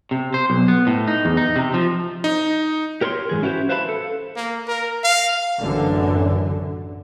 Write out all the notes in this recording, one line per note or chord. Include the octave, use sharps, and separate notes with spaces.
C3
C5
B1
B3
A2
D#4
E2
D#4
C3
F3
D#4
G4 A#4 C#5 B5 C6
G#2 E3 G#4
C#4 E4 F#4 G4 B4 C5
B4 C5 E5 F5 A5 B5
A4
A#3
A#4
F5
A1 F#2 D3